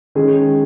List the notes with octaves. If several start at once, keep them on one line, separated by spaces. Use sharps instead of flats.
D#3 G#3 C#4 G#4